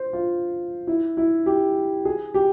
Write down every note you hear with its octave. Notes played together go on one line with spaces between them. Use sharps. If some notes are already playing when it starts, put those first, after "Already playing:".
Already playing: C5
F4
E4
E4
G4
G#4
G4